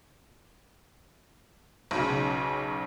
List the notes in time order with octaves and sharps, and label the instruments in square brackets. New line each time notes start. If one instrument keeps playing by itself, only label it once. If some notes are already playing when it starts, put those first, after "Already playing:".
[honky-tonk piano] B1 C#3